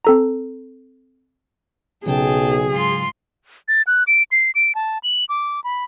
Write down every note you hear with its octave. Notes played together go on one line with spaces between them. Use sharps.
C4 A4 A#5
B1 C#3 F#3 G#4 G5 A5
G#2 F4 C6
A6
F#6
D7
C7
D7
A5
F#7
D6
B5